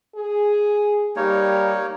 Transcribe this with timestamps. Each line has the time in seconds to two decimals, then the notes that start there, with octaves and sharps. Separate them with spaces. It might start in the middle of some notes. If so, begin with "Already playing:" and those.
0.15 G#4
1.16 G3 A#3 D#4 C#5